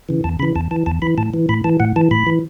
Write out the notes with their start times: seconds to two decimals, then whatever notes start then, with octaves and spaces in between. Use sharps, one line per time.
0.09 C#3 E3
0.24 E2 A5
0.39 C#3 B5
0.43 E3
0.55 E2 A5
0.71 E3 A5
0.86 E2 A5
1.02 E3 B5
1.18 A2 A5
1.34 E3
1.49 A2 B5
1.64 E3 A5
1.80 A2 F#5
1.96 E3 A5
2.11 A2 B5
2.27 E3